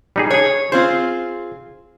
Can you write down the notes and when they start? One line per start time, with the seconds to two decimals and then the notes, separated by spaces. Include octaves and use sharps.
0.16 G3 D#4 G#4
0.31 D4 G#4 C#5
0.72 C4 F4 G#4 C5